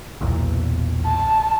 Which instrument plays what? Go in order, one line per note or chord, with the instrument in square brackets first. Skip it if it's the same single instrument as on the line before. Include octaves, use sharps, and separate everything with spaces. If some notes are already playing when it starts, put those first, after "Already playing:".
[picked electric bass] B1 E2 A#2
[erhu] A5